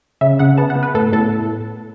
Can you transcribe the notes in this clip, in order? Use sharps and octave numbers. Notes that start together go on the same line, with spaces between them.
C#3 E5
C#3 F#5
B3 A5
F#5
B3
B4
A2 A4
A2 A4